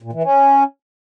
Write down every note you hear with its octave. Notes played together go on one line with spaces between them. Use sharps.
A#2
E3
C#4